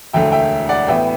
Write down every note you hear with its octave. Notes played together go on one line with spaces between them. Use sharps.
E1 D2 D3 A3 E5 G5
E5 G5
D5 F#5
A1 A2 E3 B3 E5 G5